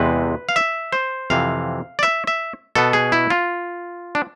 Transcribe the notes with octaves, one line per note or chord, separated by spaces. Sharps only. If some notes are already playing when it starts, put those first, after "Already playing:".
Already playing: E2 C3 G#3 C4 B4
F5
E5
C5
F2 C3 E3 F5
D5
E5
E5
B2 B3 A4
G#4
E4
F4
D4